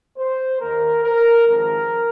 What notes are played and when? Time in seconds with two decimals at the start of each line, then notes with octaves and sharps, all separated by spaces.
0.17 C5
0.60 D#2 D#3 A#3 A#4
1.03 A#4
1.46 G#1 G#2 F3 C4 A#4